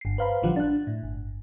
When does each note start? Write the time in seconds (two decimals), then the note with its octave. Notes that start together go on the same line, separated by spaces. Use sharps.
0.01 G1 C7
0.18 B4 C5 F5 A#5 B5
0.42 A1 D3 F3 G3 F5 F#5
0.56 D4 F#6
0.87 A2
1.03 G1